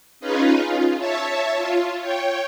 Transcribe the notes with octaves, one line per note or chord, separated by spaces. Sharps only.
C#4 D#4 F4 G#4 B4
F4
C#5 E5 A5
F4
C#5 G5